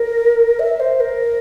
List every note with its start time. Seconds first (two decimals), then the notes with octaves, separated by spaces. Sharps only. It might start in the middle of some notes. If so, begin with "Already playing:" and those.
Already playing: A#4
0.59 E5
0.80 C5
1.00 A#4